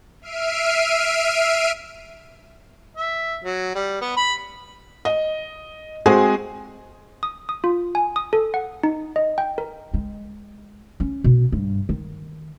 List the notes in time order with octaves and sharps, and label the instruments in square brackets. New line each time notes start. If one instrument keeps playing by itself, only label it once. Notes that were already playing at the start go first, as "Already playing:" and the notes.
[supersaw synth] E5 F6 C7 D7 D#7
[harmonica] E5
F#3
G3
B3
B5
[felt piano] D#5
G#3 C4 F#4 G#4 C5 G#5
[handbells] D#6
D#6
F4
G#5
D#6
A4
F#5
D#4
D#5
G5
A#4
[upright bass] G#3
C#4
B2
G2
D#3